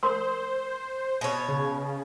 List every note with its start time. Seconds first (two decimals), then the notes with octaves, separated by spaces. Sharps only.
0.03 A#4 C5 C6 E6
1.21 B2 C#5
1.49 C#3